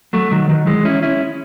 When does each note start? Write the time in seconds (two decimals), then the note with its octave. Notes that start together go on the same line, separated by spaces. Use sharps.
0.13 F#3 A3
0.32 D#3 F#3
0.49 D#3 F#3
0.66 E3 G#3
0.85 C#4 E4
1.03 C#4 E4